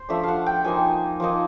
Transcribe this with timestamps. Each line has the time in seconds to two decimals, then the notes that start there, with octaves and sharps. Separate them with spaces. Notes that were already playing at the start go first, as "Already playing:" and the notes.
Already playing: C5
0.09 F3 A3 D4 E5
0.23 F5 F#5
0.46 G5
0.64 F3 A#3 D#4 G#5
1.20 F3 A#3 D#4